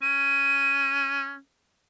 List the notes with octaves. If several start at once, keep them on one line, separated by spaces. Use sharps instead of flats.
C#4 D#7